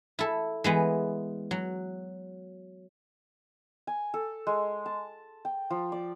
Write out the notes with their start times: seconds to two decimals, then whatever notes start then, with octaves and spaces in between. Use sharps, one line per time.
0.19 E4 A4
0.64 E3 G#3 B3
1.51 F#3
3.87 G#5
4.14 A4
4.47 G#3
4.86 A5
5.45 G5
5.70 F3
5.92 D5